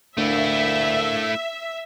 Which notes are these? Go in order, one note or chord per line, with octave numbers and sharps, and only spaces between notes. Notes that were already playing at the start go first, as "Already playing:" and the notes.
D2 A3 D4 E4 A#4 E5 F5